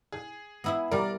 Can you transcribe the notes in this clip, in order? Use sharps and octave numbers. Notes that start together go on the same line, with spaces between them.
G#4
B3 E4 E5
G3 A#4 D5